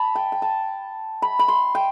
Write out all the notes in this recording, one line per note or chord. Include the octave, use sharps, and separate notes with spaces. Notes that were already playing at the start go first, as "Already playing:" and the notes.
Already playing: A5 B5
G5
G5
A5
B5
B5
C6
G5